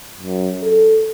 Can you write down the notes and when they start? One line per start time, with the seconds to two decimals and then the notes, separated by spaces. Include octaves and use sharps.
0.21 F#2
0.63 A4